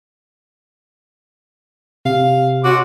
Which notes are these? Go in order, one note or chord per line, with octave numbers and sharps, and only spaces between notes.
C3 F5
C#4 F#4 C6 D6